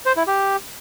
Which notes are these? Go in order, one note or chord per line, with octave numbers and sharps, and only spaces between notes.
C5
E4
G4